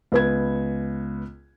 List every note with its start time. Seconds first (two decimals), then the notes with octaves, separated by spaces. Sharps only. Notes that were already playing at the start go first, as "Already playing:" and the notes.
0.12 C#2 B3 G#6